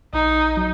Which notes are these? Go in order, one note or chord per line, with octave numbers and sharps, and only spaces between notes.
A#1 D#4
F#3